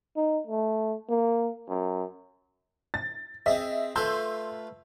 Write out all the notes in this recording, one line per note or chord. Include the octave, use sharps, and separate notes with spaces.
D#4
A3
A#3
F#2
A6
C4 G#4 D#5 E5
A3 F4 B4 C6 E6 G6